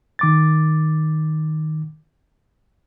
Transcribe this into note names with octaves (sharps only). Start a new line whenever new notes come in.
D#3 D6 A6